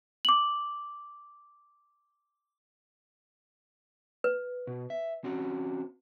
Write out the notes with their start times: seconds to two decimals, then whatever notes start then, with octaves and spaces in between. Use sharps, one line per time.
0.25 D6 F#7
4.24 B4
4.67 B2
4.90 E5
5.24 C4 C#4 F#4